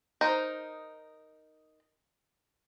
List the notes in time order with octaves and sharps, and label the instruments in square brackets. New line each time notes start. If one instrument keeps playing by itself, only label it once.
[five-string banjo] D#4 A#4 C5